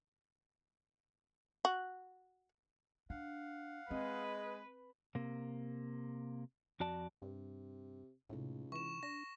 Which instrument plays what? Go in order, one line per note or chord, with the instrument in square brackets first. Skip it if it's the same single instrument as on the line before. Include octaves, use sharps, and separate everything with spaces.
[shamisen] F#4
[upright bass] D4 [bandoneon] F5 F#5
[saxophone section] G#3 D#5 [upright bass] C4 [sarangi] B4
[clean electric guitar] C3 A#3
F2 F#4 D5 A5
[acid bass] G2 [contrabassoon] C3
[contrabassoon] C#2 [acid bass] A2 [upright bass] C3 D#4
[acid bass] E3 [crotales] C#6 E7
[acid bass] D4 [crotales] A#6